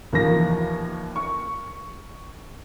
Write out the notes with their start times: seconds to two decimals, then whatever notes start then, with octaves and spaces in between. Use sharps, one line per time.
0.13 D#2 E3 F3 A#3 A#6
1.16 C#6